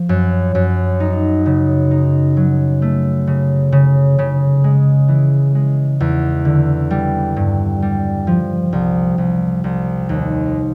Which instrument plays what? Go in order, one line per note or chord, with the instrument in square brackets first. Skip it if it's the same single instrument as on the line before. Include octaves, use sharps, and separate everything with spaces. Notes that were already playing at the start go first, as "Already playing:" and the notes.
Already playing: [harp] F3
F#2
F#2
D#4
C#3
D#4
F#3
A3
C#3
C#3
C#3
G#3
E3
G#3
E2
D3
G3
G2
G3
F3
C2
C2
C2
D#2